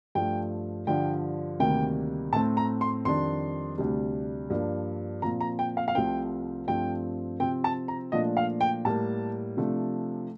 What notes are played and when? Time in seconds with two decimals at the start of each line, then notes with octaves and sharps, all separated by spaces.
0.15 G2 F3 A3 G5
0.87 G2 D3 F3 G5
1.60 D2 C3 D#3 G3 A#3 G5
2.32 A2 A3 C4 A5
2.57 A#5
2.81 C6
3.05 F2 D#3 G3 D4 C6
3.78 D2 C3 G3 D4
4.50 G2 F3 A#3 D4
5.22 A#2 F3 C4 A#5
5.41 A#5
5.59 G5
5.77 F5
5.88 F5
5.95 C2 C3 F3 A3 C4 G5
6.67 G2 F3 A3 C4 G5
7.40 C3 F3 C4 G5
7.64 A5
7.88 A#5
8.12 A#2 F3 A3 D4 D#5
8.37 F5
8.61 G5
8.85 A2 G3 A#3 A5
9.57 C3 F3 A3 D4